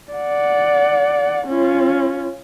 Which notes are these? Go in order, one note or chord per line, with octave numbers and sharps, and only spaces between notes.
D5 F#5
C#4 F4